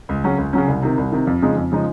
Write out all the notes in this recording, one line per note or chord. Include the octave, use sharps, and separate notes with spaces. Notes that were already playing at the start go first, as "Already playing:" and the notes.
C#2
C#3 F#3 C#4
C#2
C#3 F#3 C#4
C2
C3 D#3
C2
C3 D#3
F2
C#3 F3 G#3 D#4
F2
C#3 F3 G#3 D#4